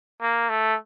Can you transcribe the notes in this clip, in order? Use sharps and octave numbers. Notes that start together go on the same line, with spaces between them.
A#3
A3